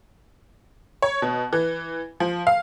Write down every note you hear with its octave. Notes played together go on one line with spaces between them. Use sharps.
C#5
B2
E3
F3
F5